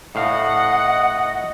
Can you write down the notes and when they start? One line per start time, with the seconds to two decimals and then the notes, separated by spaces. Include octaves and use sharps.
0.15 A2 D#5 F5 F#5